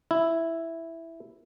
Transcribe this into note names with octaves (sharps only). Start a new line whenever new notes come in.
E4